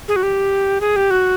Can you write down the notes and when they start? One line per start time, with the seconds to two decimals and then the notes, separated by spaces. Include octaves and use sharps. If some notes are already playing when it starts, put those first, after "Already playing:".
0.08 G#4
0.16 F#4
0.23 G4
0.81 G#4
0.96 G4
1.11 F#4